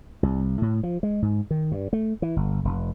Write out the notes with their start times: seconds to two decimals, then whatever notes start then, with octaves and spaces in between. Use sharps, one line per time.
0.23 C2
0.62 A2
0.83 F3
1.03 G#3
1.22 G#2
1.51 D#3
1.72 G2
1.93 A3
2.22 E3
2.37 G1
2.65 F1